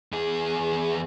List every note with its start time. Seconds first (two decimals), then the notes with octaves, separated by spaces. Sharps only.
0.12 E2 G#4